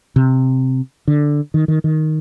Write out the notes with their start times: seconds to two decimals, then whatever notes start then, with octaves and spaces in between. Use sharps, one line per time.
0.16 C3
1.08 D3
1.54 D#3
1.68 D#3
1.84 D#3